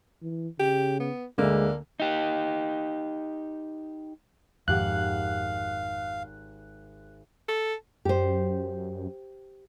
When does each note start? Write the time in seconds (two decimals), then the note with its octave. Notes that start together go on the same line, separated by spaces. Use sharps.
0.22 E3
0.59 C#3 G4
1.00 B3
1.38 D2 D3 G#3 A#3
2.00 D#4 G4
4.68 G#1 F2 G#2 G4 F5 F#5 F#6
7.49 A4
8.05 F#2 G4 C5